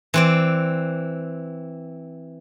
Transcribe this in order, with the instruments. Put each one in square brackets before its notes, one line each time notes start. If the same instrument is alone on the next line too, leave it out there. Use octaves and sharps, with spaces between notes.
[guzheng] E3 C4 D5